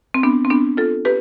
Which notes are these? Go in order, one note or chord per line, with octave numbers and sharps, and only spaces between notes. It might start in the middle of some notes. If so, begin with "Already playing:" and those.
C4
B3 D4
C4
B3 D4
F4 A4
G4 B4